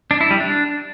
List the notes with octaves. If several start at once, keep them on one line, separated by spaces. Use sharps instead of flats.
D4
E4
G3
D4